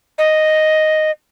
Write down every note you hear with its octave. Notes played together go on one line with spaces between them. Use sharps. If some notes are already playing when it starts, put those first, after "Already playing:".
D#5